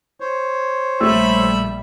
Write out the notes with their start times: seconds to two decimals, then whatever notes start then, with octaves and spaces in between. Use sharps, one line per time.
0.20 C5 C#5
1.00 A#1 G3 A3 A4 E5 B5 E6